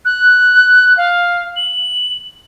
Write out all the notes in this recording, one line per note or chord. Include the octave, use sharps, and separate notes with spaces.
F#6
F5
F#7